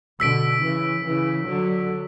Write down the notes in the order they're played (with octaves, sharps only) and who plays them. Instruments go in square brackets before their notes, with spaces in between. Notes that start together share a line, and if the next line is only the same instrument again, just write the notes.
[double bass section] B2 D3 [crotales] E6 B6 D7
[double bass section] C#3 E3
C#3 E3
D3 F#3